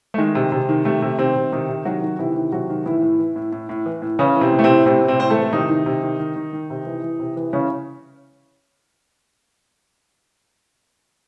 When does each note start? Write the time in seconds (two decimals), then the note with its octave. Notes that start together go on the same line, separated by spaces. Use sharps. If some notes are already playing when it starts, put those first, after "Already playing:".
0.14 A3
0.18 D#3 G#3
0.35 C3
0.52 C3
0.69 D#3
0.85 C3 A3
1.02 C3
1.18 C3 D#3 C4
1.35 C3
1.52 C3 D#3 D#4
1.69 C3
1.85 D#3 F#3 F#4
2.02 D#3
2.19 C3 E3 E4
2.35 D#3
2.52 C3 F#3 F#4
2.69 D#3
2.86 A2 E3 E4
3.02 A2
3.20 E3
3.36 A2
3.52 A2
3.69 A2
3.86 E3
4.02 A2
4.19 C#3 E3 C#4
4.36 E3
4.41 C3 C4
4.52 A2
4.59 A3
4.64 C3 C4
4.69 A2
4.86 A2 C3 C4
5.02 A2
5.08 C3 C4
5.20 A2 C5
5.30 A3 A4
5.36 E3
5.53 C3 D#3 D#4
5.69 D#3
5.86 C3
6.03 D#3
6.19 D#3
6.36 D#3
6.53 D#3
6.70 C3
6.86 E3
7.03 E3
7.20 C3
7.37 E3
7.53 C#3 E3 C#4